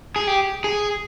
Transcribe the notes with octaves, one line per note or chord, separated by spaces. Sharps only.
G#4
G4
G#4